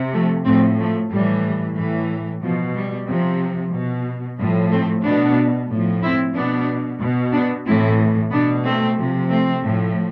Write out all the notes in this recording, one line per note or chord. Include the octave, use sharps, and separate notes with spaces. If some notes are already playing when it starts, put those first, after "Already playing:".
Already playing: C3
F3 A3
A2 F3 A3 C4
F3 A3
A2 E3 G3
A2 E3
B2 F3
G3
C3 F3
B2
A2 F3 G3
A3 C4
B2 B3 D4
A2 F3
C4 E4
B2 B3 D4
B2
B3 D4
A2 E3 C4 E4
B2 B3 D4
A3 C4
C3 F3
A3 C4
A2 F3